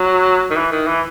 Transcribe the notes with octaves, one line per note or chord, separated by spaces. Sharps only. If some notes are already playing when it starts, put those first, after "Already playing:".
Already playing: F#3
D#3
E3
D#3
E3